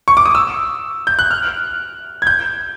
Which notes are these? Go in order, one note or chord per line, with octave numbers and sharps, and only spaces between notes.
C#6
D6
D#6
E6
G6
F#6
F6
G#6
G6